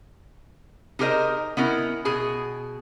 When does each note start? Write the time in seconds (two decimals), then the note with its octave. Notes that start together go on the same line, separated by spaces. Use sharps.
0.99 D#4 G4 G#4 A#4 C5 D#5
1.57 B3 C#4 E4 A#4
2.05 B2 G#4 G#5